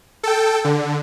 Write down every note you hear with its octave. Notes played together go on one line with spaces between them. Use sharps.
A4 G5
D3